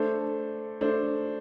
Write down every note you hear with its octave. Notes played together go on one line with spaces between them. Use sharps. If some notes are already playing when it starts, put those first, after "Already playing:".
Already playing: A3 D4 A4 C5
A3 D4 A4 C5